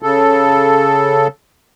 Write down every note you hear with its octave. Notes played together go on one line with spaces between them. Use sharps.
C#3 A4